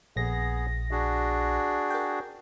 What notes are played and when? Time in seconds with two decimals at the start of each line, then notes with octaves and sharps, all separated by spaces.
0.16 A#1 B3 G#4 A#6
0.91 D4 F#4 G#4
1.90 A#4 G5